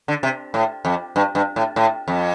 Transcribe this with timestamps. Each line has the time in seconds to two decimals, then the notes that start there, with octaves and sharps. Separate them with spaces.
0.08 D3
0.23 C3
0.54 A2
0.85 F2
1.16 G2
1.35 G2
1.56 A2
1.76 A2
2.08 F2